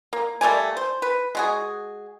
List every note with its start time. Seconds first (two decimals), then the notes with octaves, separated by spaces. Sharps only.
0.13 A#3
0.41 G3 A3 A#3 G#5
0.77 C5
1.02 B4
1.35 G#3 F#4 G#4